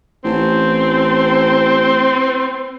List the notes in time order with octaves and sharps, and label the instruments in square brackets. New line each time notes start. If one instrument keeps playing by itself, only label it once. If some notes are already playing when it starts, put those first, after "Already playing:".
[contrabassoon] A1 [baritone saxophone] C4